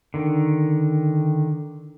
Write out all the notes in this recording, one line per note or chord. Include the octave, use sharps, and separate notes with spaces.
D3 D#3